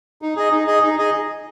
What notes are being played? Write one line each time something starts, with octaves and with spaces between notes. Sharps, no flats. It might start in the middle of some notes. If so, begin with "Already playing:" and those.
D#4
G#4 D#5
D#4
G#4 D#5
D#4
G#4 D#5